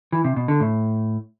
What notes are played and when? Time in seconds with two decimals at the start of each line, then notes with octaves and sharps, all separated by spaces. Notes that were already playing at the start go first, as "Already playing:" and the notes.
0.13 E3
0.24 C3
0.36 B2
0.48 D3
0.60 A2